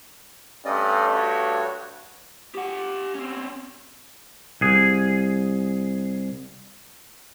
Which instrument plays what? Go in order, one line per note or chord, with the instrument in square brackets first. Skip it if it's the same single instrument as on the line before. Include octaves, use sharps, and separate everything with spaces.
[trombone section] G2 A3 [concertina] C#4 D5 D#5
[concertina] F#4 C#5
[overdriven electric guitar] G4 F#5
C4 C#4
[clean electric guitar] C2 G#4